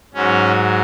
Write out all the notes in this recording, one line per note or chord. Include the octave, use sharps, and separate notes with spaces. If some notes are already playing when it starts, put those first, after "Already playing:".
G#2 F#3 C#4